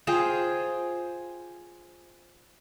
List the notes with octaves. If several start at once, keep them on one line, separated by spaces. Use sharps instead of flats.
F4 G#4 C5 G5